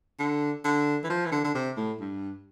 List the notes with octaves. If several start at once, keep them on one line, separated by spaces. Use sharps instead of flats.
D3
D3
E3
F3
E3
D3
D3
C3
A2
G2